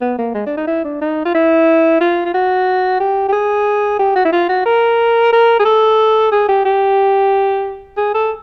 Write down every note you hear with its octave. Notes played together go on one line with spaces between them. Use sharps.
B3
A#3
G#3
D4
D#4
E4
D4
D#4
F4
E4
F4
F4
F#4
G4
G4
G#4
G4
F#4
E4
F4
F#4
A#4
A#4
G#4
A4
G#4
G4
G4
G#4
A4